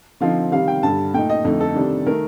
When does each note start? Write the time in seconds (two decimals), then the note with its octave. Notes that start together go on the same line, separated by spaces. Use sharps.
0.20 D3 F3 C4 D#4 F5
0.51 C3 D#3 G3 F5
0.68 G5
0.83 G2 D3 G3 A5
1.14 A#2 A3 D#4 G5
1.30 D#5
1.44 F2 D3 A3 D#4
1.60 A4
1.75 C3 D#3 G3 D4
2.07 D#3 A3 A#4